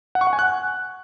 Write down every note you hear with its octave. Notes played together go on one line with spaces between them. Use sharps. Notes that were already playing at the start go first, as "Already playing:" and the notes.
F#5
C#6
F#5
G#5
F#6